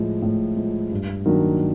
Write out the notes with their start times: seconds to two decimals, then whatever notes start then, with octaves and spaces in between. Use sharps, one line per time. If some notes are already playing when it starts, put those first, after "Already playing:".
Already playing: A2 F3 G#3
0.22 A2
0.56 F3 G#3
0.91 G2
1.26 D#3 F#3 A#3 D4